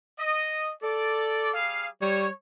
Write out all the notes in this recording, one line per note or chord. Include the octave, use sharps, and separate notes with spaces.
D#5
A4 D5
G3 G#4 F5
G3 C#5